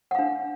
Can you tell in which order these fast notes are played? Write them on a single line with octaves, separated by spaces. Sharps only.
F#5 F5 D4